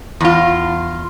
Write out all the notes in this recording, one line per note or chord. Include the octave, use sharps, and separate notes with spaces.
E2 F4